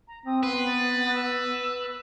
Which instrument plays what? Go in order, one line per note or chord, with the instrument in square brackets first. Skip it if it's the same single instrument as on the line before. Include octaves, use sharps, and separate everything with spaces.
[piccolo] A#5
[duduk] C4 [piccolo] D#6
[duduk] B3 [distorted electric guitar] B4 [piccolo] C6
[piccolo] A6
E6